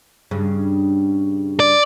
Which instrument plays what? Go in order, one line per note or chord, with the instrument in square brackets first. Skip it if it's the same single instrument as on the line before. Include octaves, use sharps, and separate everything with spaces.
[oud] G2 C#3
[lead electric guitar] D5